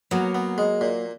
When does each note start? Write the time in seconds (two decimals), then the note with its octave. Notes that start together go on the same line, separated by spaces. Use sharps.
0.11 F#3 A#3 B3
0.35 B3
0.58 G#3
0.81 A#2